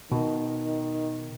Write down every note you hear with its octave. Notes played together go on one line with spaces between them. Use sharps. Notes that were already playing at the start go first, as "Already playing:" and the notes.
B2 D#3